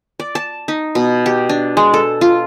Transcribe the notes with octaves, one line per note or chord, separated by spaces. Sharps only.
D5
A5
D#4
B2
G4
D4
G#3
A4
F4